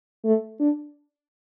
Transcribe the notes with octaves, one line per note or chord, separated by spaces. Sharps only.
A3
D4